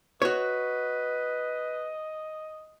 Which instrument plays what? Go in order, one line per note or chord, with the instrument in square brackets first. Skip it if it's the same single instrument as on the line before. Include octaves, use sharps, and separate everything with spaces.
[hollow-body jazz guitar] F#4 C#5 [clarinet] B4 [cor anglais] D#5